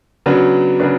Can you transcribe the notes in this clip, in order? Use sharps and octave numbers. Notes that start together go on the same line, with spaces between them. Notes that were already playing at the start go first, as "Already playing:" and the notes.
C#3 F#3 B3 D4
C#3 F#3 B3 D4